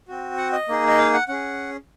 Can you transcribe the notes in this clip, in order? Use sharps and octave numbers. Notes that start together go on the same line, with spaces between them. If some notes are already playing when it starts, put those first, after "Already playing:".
C4 F#4
F#5
D#5
A#3 D#4 G#4
D#5
F5
F#5
C#4 G#4 F#5